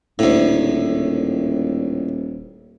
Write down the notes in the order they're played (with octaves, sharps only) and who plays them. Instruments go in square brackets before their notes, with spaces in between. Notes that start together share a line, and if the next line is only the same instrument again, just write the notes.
[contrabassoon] D#1 [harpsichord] D2 A2